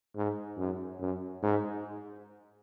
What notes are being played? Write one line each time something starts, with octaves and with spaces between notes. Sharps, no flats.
G#2
F#2
F#2
G#2